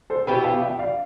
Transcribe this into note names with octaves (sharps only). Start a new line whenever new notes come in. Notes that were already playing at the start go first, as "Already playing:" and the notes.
A4 C5
B2 B3 E4 G4 G5 B5
F5 A5
E5 G5
D5 F5